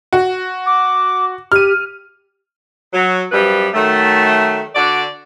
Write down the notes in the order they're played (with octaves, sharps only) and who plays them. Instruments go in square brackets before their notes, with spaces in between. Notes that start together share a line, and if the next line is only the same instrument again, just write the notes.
[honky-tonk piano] F#4
[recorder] D6
[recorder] G4 [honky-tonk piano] F6 D#7
[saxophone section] F#3
F#2 F3 G3 B4
D#3 F#3 A3
D3 F#4 D5